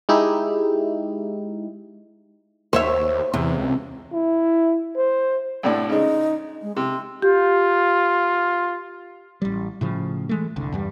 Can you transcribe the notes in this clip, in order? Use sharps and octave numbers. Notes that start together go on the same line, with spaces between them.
G#3 D#4 E4 G4
D#2 C5 C#5 E5
E2 C3
C#2
E4
C5
C2 A2 D4 D5
C#3 G#3 D#4
G#3
C3 C6
F4 G4
A1 G3
A2 C#3 F3
E3 G#3 A3
F#1 C2 D3
E2 G2 G3